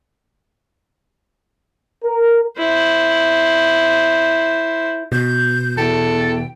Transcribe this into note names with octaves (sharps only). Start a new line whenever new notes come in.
A#4
E4 C5
B2 G6
E2 A4 G5